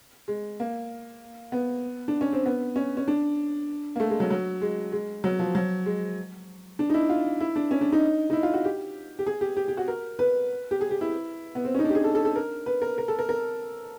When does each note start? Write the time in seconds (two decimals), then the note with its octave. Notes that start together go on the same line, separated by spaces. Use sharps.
0.28 G#3
0.60 A#3
1.52 B3
2.08 D4
2.21 C#4
2.33 C4
2.46 B3
2.76 C#4
2.97 C#4
3.08 D4
3.96 A#3
4.00 A3
4.10 G#3
4.20 F#3
4.30 F#3
4.62 G#3
4.92 G#3
5.24 F#3
5.39 F3
5.55 F#3
5.86 G#3
6.79 D4
6.90 D#4
6.94 E4
7.09 F4
7.40 E4
7.56 D4
7.71 C#4
7.81 D4
7.92 D#4
8.30 D#4
8.33 E4
8.43 F4
8.54 F#4
8.65 G4
9.19 G4
9.26 G#4
9.41 G4
9.57 G4
9.68 G4
9.77 F#4
9.88 A#4
10.19 B4
10.71 G4
10.81 G#4
10.91 G4
11.01 E4
11.55 B3
11.64 C4
11.75 C#4 D#4
11.84 D4
11.90 G4
11.95 G#4
12.04 A4
12.15 A4
12.25 A4
12.36 A#4
12.66 B4
12.82 A#4
12.98 A#4
13.08 A4
13.19 A#4
13.29 A#4